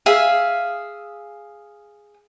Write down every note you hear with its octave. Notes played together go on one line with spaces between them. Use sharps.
G#4 E5 F5